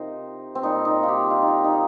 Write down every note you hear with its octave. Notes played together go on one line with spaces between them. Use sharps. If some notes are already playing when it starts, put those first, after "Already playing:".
Already playing: C3 F3 D#4 A#4 C5 D#5
C4
A#2 G3 D#4
D#4
F4
G4
F4
D#4
F4
D#4